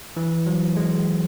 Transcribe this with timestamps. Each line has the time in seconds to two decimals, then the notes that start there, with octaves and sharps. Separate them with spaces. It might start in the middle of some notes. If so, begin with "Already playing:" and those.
0.17 E3
0.46 F#3
0.76 G#3